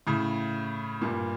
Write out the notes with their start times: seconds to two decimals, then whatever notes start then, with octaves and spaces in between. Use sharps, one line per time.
0.07 A2 C#3
1.02 G2 A#2